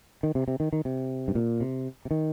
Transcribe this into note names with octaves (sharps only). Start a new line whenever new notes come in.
D#3
C3
C3
D#3
D#3
C3
G2
A#2
C3
C3
D#3